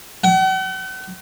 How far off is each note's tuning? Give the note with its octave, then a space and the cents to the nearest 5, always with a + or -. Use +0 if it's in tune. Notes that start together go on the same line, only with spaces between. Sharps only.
F#5 +45